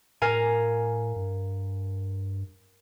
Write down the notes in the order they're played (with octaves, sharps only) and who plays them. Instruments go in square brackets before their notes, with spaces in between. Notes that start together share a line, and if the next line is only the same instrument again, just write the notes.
[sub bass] A2 [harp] A#4 F5 G#5
[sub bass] G2